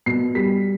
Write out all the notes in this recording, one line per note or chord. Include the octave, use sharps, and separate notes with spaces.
B2 C7
G3 B6